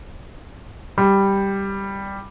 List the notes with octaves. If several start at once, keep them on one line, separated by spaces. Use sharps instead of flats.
G3